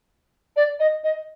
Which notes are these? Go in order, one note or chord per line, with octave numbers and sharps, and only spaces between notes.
D5
D#5
D#5